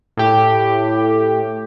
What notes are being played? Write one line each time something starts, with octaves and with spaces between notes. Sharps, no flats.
A2 G4